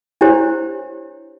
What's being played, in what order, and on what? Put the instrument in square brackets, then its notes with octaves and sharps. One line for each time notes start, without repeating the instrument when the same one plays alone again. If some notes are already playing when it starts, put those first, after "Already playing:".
[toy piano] D4 E4 G4 C5 C#5